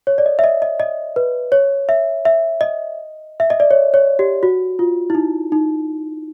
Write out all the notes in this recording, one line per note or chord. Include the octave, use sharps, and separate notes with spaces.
C#5
D5
D#5
E5
D#5
D#5
D#5
B4
C#5
E5
E5
D#5
E5
D#5
D5
C#5
C#5
G4
F#4
F4
E4
D#4
D#4